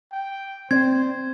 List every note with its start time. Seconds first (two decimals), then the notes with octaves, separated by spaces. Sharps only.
0.12 G5
0.71 C4 C5 D5 G#6